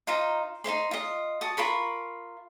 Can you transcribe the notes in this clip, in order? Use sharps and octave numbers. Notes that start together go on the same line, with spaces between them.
D#4 F4 C5 A#5
D#4 E4 C5 C6
F4 D#5
F#4 A5 D#6
F4 A#4 B5 C#6